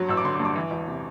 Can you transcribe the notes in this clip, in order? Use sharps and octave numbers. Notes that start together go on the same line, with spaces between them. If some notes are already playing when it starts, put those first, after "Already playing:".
Already playing: G2 F#3
A1 E6
D6
D3 C6
D6
G2
D6
E3
E1
C3